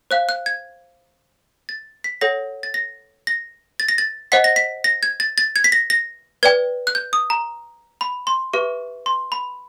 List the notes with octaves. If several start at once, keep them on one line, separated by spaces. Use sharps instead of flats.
C5 F5 F#6
F#6
G#6
A6
B6
A4 C#5 F#5 A#6
A6
A#6
A#6
A6
A#6
A6
C5 D#5 F#5 B6
A#6
B6
A#6
G#6
A6
A6
G#6
B6
A#6
A#6
B4 D5 G5 G#6
F#6
G6
D#6
A#5
B5
C6
G4 B4 E5 C#6
C6
B5